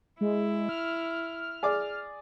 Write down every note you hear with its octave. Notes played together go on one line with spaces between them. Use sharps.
G#3 E4
F6
G#4 D5 D6